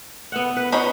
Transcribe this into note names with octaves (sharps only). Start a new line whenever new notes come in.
B3 E5 F#5
B4
C#4 D#4 C5 B5